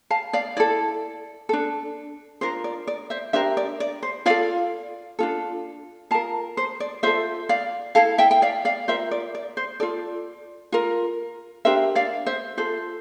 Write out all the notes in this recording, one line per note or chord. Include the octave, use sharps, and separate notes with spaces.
F5 A5
D5 F5
E4 A4 D5
D4 A4
D4 F4 A#4 C5
D5
D5
C5 E5
D4 G4 A#4 C5 E5
D5
D5
C5
F4 A4 D5 F5
D4 F4 A4
F4 A#4 F5 A5
C5
D5
F4 A4 C5 E5
D5 F5
E4 A4 F5 A5
E5 G5
G5
D5 F5
D5 F5
F4 A#4 C5 E5
D5
D5
C5
F4 A4 D5
F4 A#4
D4 G4 A#4 C5 E5
D5 F5
C5 E5
F4 A4 C5